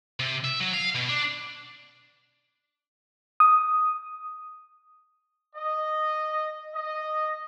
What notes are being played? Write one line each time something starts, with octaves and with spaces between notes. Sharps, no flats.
C3
E5
F#3
F5
B2
D4
D#6
D#5
D#5